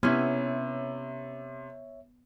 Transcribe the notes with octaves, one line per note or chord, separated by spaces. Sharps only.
C3 B3 C#4 E4 C#5 E5